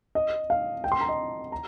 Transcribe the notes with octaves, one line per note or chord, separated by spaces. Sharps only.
D#5
F5
G5
C6
A#5
D#5
A#5